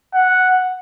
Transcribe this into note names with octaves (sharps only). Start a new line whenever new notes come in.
F#5